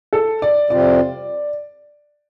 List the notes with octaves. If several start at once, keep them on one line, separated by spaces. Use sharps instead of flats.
A4
D5
F2 C3 G3 C4 F4 D5